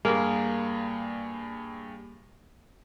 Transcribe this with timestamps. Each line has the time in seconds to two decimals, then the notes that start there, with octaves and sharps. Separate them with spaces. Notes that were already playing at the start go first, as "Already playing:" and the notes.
0.05 G2 G3 A#3 G#4